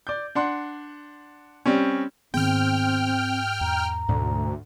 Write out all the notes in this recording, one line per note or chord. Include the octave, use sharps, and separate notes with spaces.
D5 G6
D4 F#5 C6
G3 C4 C#4
G#2 D#3 B3 C4 G5 F6
E2 A#5
D2 G#2 B2